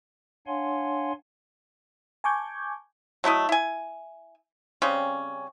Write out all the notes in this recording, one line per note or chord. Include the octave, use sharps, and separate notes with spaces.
D4 C#5 F5 F#5 G#5 C6
G#5 A5 C#6 D6 G6 G#6
F#3 A3 E4 D#5
E4 G#5
C#3 G3 C4 C#4